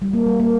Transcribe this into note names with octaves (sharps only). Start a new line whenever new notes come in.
G3
A#3
G3
A#3